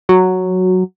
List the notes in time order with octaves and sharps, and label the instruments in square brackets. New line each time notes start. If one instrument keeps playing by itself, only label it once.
[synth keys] F#3